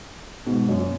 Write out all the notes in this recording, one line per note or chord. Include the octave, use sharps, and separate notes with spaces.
G#2 B2
F#2 A#2